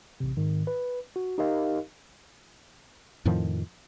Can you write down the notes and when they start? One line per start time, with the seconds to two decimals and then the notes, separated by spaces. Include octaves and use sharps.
0.20 A1 C3
0.37 G#2 D#3
0.67 B4
1.16 F#4
1.38 D#4 G4 A#4 D#5 F5
3.25 F2 A2 D#3 F3